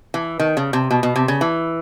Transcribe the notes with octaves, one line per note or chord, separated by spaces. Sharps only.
E3
D#3
C#3
C3
B2
B2
C3
C#3
E3